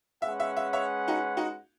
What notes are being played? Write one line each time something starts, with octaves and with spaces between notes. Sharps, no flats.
G#3 C#4 G#4 B4 E5 F#5
E5
E5
C#5 E5
D#4 F#4
D#4 F#4